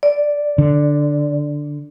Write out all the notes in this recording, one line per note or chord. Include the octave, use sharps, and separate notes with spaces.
D5
D3